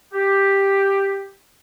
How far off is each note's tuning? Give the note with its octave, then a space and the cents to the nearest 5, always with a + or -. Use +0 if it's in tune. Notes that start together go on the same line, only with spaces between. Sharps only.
G4 +5